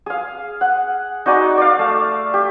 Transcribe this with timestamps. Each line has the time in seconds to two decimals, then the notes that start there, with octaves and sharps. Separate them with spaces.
0.06 G#4 F5
0.61 F#5
1.26 D#4 F#4 D5 G#5
1.58 D5 F5
1.79 A3
2.34 G4